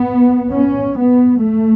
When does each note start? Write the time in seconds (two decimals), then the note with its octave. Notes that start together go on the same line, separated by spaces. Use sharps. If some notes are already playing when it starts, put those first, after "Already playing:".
Already playing: B3
0.50 C#4
0.96 B3
1.41 A3